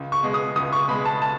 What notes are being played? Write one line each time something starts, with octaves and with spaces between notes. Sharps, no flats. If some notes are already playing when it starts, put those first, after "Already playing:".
Already playing: C#2
C#6
B2 G#3
D#6
C#2 D#6
C#6
B2 G#3 B5
A5
A5